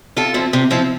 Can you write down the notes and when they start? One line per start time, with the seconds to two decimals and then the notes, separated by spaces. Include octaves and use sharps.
0.16 C3 F4 A4
0.34 F3 C4 E4
0.53 C3
0.71 F3 C4 E4